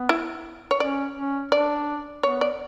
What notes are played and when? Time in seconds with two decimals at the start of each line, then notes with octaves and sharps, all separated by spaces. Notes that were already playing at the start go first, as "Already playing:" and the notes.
Already playing: B3
0.09 E4
0.71 C#5
0.80 C#4 D5
1.16 C#4
1.52 D4 D5
2.23 B3 C#5
2.41 D5